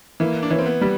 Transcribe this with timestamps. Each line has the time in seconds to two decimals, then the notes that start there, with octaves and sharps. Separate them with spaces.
0.20 E3 A#3
0.43 D4
0.50 E3 C#4
0.59 C4
0.66 B3
0.81 G3